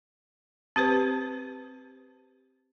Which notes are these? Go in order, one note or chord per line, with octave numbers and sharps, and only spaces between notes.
C4 G4 B4 C5